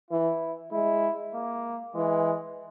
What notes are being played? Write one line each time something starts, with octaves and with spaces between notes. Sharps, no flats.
E3 E4
G#3 E4
A#3
E3 G#3